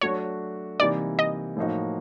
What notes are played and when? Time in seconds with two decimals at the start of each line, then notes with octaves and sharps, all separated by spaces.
0.01 F#3 A3 D4 F#4 C#5
0.80 C3 E3 G3 A#3 D#4 D5
1.19 D#5
1.57 A2 F3 A#3 D#4 F#4